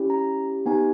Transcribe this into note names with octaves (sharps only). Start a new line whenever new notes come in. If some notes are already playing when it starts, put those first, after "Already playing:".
Already playing: C#4 E4 G4
A#5
B3 D#4 G4 G#5